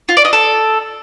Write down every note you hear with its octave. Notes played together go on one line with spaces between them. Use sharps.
F4
D5
D#5
A4